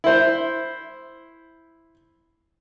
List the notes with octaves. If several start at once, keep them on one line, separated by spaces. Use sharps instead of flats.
E4 C5